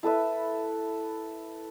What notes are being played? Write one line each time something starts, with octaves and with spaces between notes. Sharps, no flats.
E4 A4 B4 E5